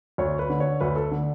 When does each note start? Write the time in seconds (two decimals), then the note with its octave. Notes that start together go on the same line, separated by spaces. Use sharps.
0.18 D2 C#5
0.39 B4
0.50 D3
0.60 C#5
0.80 D2 B4
0.96 A4
1.11 D3